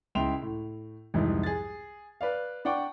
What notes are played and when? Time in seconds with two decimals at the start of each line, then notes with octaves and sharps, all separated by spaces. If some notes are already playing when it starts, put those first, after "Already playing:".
0.15 C#2 E4 G5 C6 F7
0.42 A2
1.14 C2 F2 G#2 E3
1.43 G#4 A6
2.21 B4 D5 F5
2.65 D4 D5 F#5 G5 C#6 D6